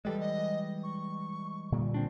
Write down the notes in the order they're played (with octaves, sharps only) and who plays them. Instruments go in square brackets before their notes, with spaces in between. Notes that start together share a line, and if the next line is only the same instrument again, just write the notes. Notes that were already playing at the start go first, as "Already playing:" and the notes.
[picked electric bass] E3 G3 G#3 [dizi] A4
[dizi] D#5
C#6
[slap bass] A#2 D3 G3
[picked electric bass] C4 D4